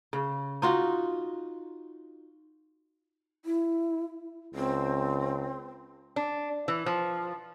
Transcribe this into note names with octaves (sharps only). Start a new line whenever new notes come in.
C#3
D#4 F4 F#4
E4
C#2 C4
D4
E3
F3